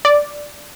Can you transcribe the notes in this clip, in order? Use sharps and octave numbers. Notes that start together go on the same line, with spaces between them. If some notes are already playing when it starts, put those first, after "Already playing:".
D5